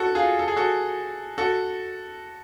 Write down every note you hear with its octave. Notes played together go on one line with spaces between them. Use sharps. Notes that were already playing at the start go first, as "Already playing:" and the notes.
Already playing: F#4 A4
F4 G#4
A4
G#4
F#4 A4
F#4 A4